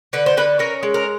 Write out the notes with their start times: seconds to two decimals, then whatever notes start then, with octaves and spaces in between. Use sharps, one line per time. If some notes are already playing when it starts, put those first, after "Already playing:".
0.13 D3 B4
0.26 C5
0.37 D3 B4
0.59 C#4 A#4
0.83 G#3
0.94 A#4